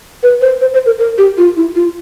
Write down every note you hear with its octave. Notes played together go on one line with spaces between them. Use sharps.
B4
C5
C5
C5
A#4
A#4
G4
F4
E4
F4